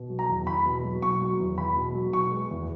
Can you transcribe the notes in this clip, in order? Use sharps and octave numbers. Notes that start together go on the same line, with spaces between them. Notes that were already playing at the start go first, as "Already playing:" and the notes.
Already playing: B2
F#3
A#5
E2
E2 B5
B2
F#3
B2 C#6
F#3
E2
E2 B5
B2
F#3
B2 C#6
G#3
E2